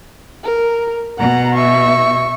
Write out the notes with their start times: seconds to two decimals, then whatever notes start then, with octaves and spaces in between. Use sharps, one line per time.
0.44 A#4
1.19 B2 F#5 A#5
1.55 E5 C#6